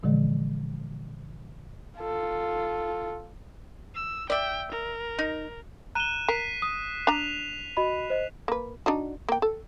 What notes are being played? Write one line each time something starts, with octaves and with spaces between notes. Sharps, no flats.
A#2 D3 E3 F3 G#3
F4 A4
E6
D5 E5 G5
A#4
D#4
A#5 F#6 D#7 E7 G7
A#4 B6 C7
D#6
D4 A#5 F7
F#4 D#5 B5
C5 D#5
A#3 B4
D4 D#4 F#4
A#3 G5
A4